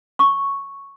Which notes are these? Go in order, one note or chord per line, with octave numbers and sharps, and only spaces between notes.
C#6